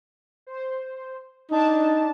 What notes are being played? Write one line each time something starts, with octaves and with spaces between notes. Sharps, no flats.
C5
D4 D#4 A5